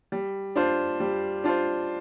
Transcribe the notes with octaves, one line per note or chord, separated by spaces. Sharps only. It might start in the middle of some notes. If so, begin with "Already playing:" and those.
G3
D4 F4 C5
G3
D4 F4 C5